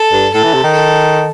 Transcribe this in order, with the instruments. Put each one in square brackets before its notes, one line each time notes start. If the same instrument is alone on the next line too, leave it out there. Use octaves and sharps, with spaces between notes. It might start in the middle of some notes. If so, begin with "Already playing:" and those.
Already playing: [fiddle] A4
[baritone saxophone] G2
[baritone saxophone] A2 [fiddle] A4
[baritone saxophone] E3
C3
D#3
[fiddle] A4